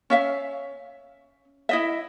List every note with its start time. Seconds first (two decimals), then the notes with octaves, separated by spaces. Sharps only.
0.10 C#4 E5 F5
1.69 E4 D#5 E5